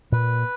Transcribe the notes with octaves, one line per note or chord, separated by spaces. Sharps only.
A#2 B4